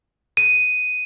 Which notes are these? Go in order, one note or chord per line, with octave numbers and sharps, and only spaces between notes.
D#7